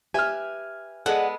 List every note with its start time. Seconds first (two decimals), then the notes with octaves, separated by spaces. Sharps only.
0.14 G4 B4 E5 G#5 F6
1.06 G#3 B3 G#4 A4 D5 F#5